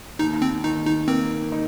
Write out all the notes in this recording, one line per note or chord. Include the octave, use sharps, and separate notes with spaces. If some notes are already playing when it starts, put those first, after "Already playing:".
D#2 D#4
C4
D#3 D#4
D#4
A#3 C4
D#4